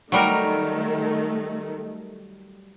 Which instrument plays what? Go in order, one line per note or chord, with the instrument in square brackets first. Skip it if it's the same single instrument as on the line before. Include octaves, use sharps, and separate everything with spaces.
[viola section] D#3 A3 [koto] F#3 G3 A#4